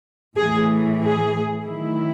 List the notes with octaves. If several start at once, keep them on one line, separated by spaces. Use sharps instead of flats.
A2 E3 A3 G#4
G#4
D#3 F#3 A3 E4